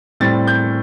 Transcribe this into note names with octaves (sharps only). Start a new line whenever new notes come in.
A2 G3 C4 A6
G6